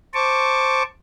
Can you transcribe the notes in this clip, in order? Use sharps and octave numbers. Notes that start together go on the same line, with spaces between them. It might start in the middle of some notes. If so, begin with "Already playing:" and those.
C5 A5 C#6 D6